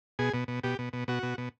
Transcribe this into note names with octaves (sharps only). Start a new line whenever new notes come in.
B2 G#4
B2
B2
B2 G4
B2
B2
B2 F#4
B2
B2